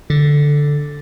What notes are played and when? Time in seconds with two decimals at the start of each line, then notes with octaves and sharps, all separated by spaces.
0.10 D3